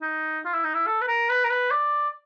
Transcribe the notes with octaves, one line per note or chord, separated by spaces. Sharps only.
D#4
F4
E4
D#4
E4
A4
B4
A#4
B4
A#4
B4
D5